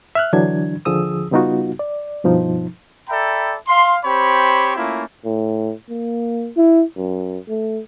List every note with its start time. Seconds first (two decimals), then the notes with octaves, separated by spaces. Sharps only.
0.15 E5 F6 F#6
0.33 D3 E3 F#3 D4 G#6
0.85 D#2 D3 F3 G#4 D#6 E6
1.31 C#3 G3 B3 D#4 F4 F#4
1.79 D5
2.24 G2 B2 F3 D#4
3.09 A4 D5 E5 G5 A#5 B5
3.67 F5 C6
4.04 C4 G4 C5 C#5 B5
4.76 A3 A#3 C#4 E4 F4
5.25 A2
5.89 A#3
6.57 E4
6.97 F#2
7.48 A3